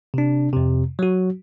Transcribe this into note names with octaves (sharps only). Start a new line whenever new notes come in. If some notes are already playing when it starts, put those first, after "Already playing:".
C3 D4
F2 C3
F#3 F#4